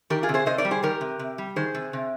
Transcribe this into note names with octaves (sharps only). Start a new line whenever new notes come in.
D#3 G4 A#4
F4 G#4
C3
G#4 C5
C3 C5 D#5
A#4 D5
G3
G#4 C5
D#3 G4 A#4
C3
C3
G3
D#3 G#4 C5
C3
C3